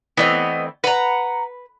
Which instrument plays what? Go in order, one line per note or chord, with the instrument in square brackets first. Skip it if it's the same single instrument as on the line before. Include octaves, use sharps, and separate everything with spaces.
[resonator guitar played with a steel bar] E3 A3 C4 [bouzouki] B3 D#5
[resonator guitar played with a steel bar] B4 [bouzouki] F#5 A#5